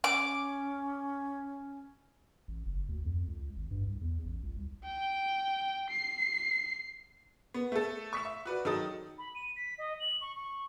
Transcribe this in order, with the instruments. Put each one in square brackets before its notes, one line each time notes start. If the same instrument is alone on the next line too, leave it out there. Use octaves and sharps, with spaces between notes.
[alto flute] C#4 [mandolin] D6
[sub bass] A1
F#1
D2
F2
C#2
G#1
G2
C2
E2
A1
C#2
C2
[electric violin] G5
C7
[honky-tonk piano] B3
A3 A4
C#6 B6 E7
E5
F#4 B4 D5
D#3 F#3 A4 D#6
[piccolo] B5
D#7
B6
D#5
F#7
C#6
C#6